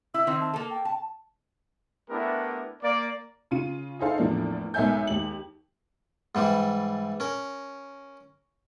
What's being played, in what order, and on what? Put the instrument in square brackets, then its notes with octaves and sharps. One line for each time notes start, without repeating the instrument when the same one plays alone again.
[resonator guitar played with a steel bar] E4 [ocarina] E6
[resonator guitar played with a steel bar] D#3 C4 E4
[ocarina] A5
[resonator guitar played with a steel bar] A#3 A4
[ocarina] G5
[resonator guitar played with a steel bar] A5
[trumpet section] A3 B3 D4 E4 G4 A#4
A#3 D5
[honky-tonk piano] C#3 F4 D#7
D#4 E4 G#4 A4 C5 F5
E2 A2 F3 A#3 D4
B1 G#2 A#4 E5 G#5 G6
D#2 G#3 F#7
[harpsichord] G#2 E3 G3
C#4 A#4